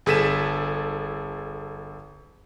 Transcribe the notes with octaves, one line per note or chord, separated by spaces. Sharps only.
G1 G#4 A4 B6 D#7 E7